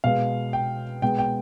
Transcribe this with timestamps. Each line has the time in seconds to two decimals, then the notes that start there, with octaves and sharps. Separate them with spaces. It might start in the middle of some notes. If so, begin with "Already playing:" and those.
0.04 B2 G#3 B3 F5
0.53 G5
1.02 B2 G#3 B3 G5
1.19 G5